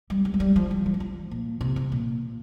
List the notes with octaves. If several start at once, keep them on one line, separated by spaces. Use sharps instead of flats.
G3
G3
G#3
G3
F3
G3
F3
G3
F3
A#2
C3
C3
A#2